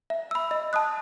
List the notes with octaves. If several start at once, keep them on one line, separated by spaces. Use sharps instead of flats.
E5
B5 E6
D#5
A5 D#6 F#6